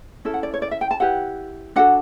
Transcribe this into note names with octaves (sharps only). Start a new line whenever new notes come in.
C#4 E4 A4
F#5
D5
C#5
D5
E5
G5
A5
E4 G4 B4 F#5
D4 F#4 A4 F#5